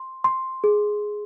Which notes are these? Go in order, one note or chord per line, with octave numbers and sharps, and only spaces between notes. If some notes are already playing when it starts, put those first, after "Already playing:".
Already playing: C6
C6
G#4